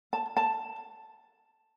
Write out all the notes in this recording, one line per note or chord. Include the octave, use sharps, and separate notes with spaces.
A5
A5